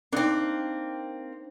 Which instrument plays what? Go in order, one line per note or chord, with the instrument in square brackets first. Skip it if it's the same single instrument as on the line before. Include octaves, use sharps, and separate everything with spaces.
[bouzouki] A#3 C4 [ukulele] D4 D#4